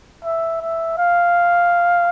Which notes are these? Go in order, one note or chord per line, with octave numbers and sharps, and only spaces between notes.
E5
E5
F5